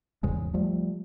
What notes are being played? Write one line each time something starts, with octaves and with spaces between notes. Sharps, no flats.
G#1 E2 C#3 G#3
F3 G3 A3